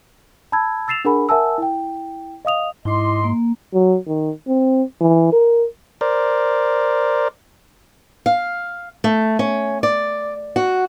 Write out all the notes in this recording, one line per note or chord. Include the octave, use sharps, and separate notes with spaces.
A5 B5 E6 G#6
E6 A6 C7 E7 F7
D4 G#4 A#4 F#5 G#5 B5
A#4 E5 F#5 G#5 A5 E6
E4 G5
D#5 F5 D#6 F7
G#2 E4 D#5 C6 D6
A#3
F#3
D#3
C4
E3
A#4
A#4 C5 D5
F5
A3
C#4
D5
F#4